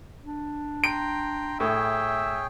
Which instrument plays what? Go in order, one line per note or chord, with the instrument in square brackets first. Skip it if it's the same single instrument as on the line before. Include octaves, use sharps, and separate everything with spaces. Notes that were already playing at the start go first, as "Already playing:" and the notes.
[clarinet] D4
[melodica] G5 A#5 C6 [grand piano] D7
[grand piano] A2 [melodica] G#4 C#5 G5 [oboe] E5